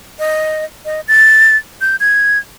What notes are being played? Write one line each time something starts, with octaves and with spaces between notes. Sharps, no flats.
D#5
D#5
A6
G6
G#6